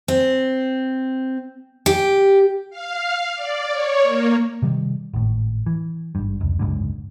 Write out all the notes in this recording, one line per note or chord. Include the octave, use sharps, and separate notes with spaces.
C4
G4
F5
D5
C#5
A#3
C3 D#3 G3
G#1 A2
E3
G#1 G2
F1 C#2
F#1 C#2 G#2 D3